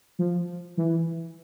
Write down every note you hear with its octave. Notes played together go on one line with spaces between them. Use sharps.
F3
E3